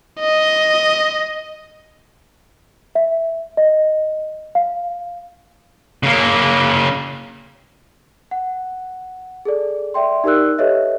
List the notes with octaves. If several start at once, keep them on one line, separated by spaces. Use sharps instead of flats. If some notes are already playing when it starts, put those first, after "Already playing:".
D#5
E5
D#5
F5
C#3 A#3
F#5
G#4 A4 D5
D5 E5 G5 C6
D#4 G4 A#4 D5 E6 F#6
G4 A4 B4 C#5 D#5 E5